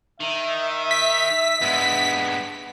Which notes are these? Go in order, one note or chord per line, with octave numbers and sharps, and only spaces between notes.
D#3 E5
B6
G2 G#3 B3